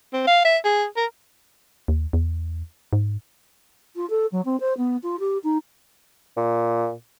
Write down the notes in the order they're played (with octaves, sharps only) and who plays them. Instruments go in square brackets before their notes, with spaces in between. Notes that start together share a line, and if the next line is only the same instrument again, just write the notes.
[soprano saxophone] C4
F5
E5
G#4
A#4
[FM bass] D#2
E2
G#2
[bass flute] F4
A4
F#3
C4
C5
B3
F4
G4
D#4
[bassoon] A#2